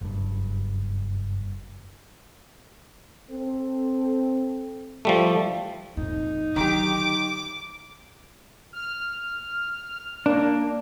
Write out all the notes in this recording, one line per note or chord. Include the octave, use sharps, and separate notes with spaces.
F#1 G2
C4 A4
F3 G3 A3
F2 A#2 D#4
D3 D#3 F#3 G4 D6
F6
A#3 D4